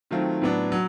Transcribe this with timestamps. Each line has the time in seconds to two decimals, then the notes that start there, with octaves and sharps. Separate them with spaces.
0.11 D#3 F#3 A3 C4 F4
0.42 A2 F#3 B3 D4
0.72 F#3